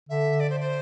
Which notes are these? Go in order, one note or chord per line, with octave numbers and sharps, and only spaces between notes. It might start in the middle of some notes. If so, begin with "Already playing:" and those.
D3 E5
D5
C5
C5